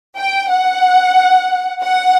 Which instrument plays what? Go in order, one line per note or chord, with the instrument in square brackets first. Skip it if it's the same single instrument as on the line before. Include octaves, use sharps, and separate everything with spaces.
[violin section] G5
F#5
F#5